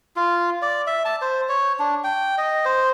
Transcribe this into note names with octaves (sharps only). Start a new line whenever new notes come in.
F4
D5
E5
A5
C5
C#5
D4
G5
D#5
C5